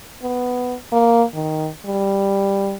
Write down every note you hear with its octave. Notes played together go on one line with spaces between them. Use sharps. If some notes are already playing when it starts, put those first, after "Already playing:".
B3
A#3
D#3
G3